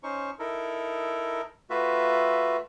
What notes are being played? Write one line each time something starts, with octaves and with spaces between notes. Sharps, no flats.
C#4 D#4 C5 C#6
D#4 E4 A4 A#4
A3 F4 F#4 B4 E5